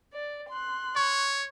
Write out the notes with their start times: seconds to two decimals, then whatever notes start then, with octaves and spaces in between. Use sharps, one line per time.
0.14 D5
0.49 C6 F#6
0.96 C#5 C#6